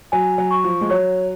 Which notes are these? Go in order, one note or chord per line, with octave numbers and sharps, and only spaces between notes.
F#3 G#5
F#3
C#6
F3
G#3
F#3 C#5